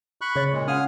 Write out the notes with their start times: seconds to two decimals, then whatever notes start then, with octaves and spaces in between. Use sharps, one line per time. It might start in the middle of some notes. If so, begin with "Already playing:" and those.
0.21 B5 C#6 F#6
0.35 C#3 C#5 A6
0.53 A#2 G#3
0.68 C#4 F5 F#5 G#5 D#6 F6